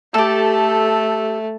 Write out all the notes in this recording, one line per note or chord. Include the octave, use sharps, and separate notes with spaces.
A3 G4 A4